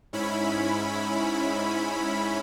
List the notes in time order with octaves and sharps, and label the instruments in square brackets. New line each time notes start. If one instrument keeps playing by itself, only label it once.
[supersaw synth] G#2 C#4 E4 B5